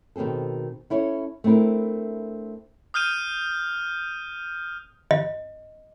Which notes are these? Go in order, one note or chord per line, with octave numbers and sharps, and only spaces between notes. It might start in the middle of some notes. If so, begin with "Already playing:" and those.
B2 D#3 C4 G#4 A4
C#4 E4 A4 C#5
A3 C4 D4 E4 A#4
D#6 F6 G6 D#7
D#5